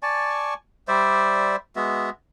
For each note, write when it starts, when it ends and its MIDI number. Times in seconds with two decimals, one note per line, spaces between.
0.03 0.54 74
0.03 0.54 80
0.03 0.54 81
0.03 0.54 85
0.88 1.56 55
0.88 1.56 72
0.88 1.56 74
0.88 1.56 76
1.76 2.10 56
1.76 2.10 59
1.76 2.10 66
1.76 2.10 76